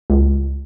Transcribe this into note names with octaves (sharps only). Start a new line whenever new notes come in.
C#2